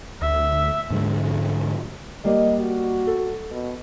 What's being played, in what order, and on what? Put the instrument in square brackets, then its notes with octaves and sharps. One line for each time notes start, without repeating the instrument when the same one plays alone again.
[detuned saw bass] D2 [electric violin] E5
[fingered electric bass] G#2 D3 F3 G#3
[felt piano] G3 A#3 D5 [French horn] D#5
[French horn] F#4
[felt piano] A4
[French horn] B2